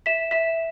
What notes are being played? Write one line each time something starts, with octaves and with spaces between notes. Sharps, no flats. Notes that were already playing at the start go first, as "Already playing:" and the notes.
E5 B6 E7
E5 B6 E7